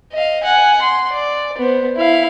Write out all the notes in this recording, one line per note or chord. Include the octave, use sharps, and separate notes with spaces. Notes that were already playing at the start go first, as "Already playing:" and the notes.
D#5 F5
F#5 G#5
C6
D5
B3 C5
E4 F5